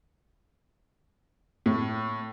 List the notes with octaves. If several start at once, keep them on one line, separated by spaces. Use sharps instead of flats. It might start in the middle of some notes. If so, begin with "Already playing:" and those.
A2